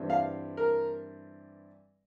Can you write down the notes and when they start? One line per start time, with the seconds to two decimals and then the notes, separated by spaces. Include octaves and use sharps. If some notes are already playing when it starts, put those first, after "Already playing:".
Already playing: G2 E3 G3 C4
0.10 F5
0.57 A#4